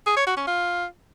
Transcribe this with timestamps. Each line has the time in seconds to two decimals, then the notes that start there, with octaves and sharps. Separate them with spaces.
0.06 G#4
0.17 C#5
0.27 F#4
0.37 C#4
0.47 F4